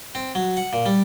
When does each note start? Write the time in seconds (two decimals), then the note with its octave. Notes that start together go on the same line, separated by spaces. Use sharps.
0.15 C4
0.35 F#3
0.57 F#5
0.73 A#2
0.86 G3